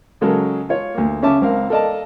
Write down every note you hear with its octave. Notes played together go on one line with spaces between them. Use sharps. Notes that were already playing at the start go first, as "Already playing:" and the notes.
C#3 F#3 G#3 A4 A#4
F4 C#5
D2 A#3
C#3 C#4 E5 A5 D6
C#2 C4 A#4 F5
A4 A#4 D5 D#5 F5 A5